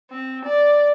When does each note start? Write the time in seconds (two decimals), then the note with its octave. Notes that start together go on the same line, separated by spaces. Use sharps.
0.11 C4
0.45 D5